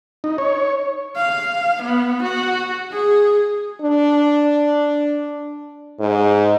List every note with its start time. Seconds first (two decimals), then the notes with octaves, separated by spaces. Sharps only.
0.24 D#4
0.38 C#5
1.16 F5
1.83 B3
2.23 F#4
2.92 G#4
3.82 D4
6.00 G#2